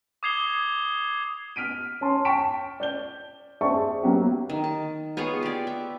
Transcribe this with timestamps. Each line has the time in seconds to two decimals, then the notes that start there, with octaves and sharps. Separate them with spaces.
0.23 D6 D#6 G#6 C7 F7 G7
1.56 F6 B6 D7 D#7
2.01 C#4 A5 C6
2.25 G5 A5 C#6 B6 D7 E7
2.80 D5 G6 G7
3.61 G#4 C5 D5 E5 A5 C#6
4.03 F#3 A#3 B3 C#4 F#4 G4
4.50 D#3
4.64 A5
5.17 B3 F4 G#4 C#5
5.43 G4 D5
5.67 E5